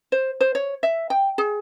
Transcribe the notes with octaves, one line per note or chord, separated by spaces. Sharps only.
C5
C5
C#5
E5
G5
G#4